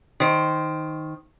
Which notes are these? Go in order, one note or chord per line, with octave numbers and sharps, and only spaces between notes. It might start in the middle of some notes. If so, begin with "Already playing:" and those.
D#3 C5